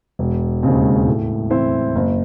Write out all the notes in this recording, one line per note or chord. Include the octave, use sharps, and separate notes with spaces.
E1
D#2 C#3 G#3 C4
A2
E3 C4 E4 C5
F#1